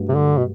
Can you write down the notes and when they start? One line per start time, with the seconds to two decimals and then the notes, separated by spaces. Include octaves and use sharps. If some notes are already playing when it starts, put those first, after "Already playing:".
Already playing: G2 F#3 A3
0.09 C3
0.16 D3
0.38 B2